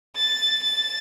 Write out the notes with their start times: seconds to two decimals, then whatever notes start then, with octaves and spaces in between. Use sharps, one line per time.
0.16 A6
0.63 A6